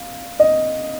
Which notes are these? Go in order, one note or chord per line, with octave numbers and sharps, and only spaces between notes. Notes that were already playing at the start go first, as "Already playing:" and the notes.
Already playing: F5
D#5